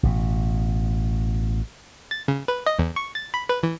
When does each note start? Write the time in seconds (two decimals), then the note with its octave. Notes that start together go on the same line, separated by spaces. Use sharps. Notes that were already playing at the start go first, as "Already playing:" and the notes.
0.03 A1 B2
2.11 A6
2.28 C#3
2.48 B4
2.66 D#5
2.79 E2
2.96 C#6
3.15 A6
3.34 B5
3.49 B4
3.63 E3